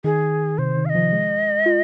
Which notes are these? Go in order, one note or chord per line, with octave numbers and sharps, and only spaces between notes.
D#3 G#4
C3 C5
D#3
F5
D#5
F3
G#3
F4